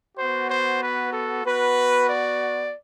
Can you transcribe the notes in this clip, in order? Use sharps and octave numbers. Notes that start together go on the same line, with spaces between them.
B3 F#4 C5
C5
B4
A4
B3 F#4 B4
D5